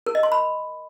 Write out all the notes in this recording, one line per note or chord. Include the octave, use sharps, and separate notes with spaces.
A#4
D#5
C6
B5